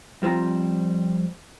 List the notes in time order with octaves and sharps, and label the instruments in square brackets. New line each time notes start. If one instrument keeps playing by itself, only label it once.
[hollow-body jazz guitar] F2 G3 C4 F4 A#5